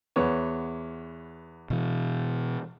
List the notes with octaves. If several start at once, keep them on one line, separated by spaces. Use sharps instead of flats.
E2 B3 C#5
B2 E3